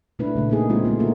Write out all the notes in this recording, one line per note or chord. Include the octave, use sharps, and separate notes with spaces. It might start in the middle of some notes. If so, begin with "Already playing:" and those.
B2 A3 D4 E4 B4
A#2 C#3 A3
A#3 D#4 G#4
G#3 A#3 C4 F4 G4
D3 A3 B3 C4
A#3 C#4 D#4 E4 F#4 A#4